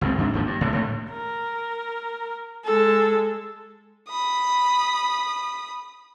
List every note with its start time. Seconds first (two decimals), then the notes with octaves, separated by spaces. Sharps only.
0.01 G1 C#2 G2 C4
0.18 D#2 G#2 D4
0.32 G#1 D#2 B2 F3
0.46 G2
0.61 A2 C3 G#3
0.73 A2 D3 A3
1.11 A#4
2.65 G#3 A4
4.09 B5 D#6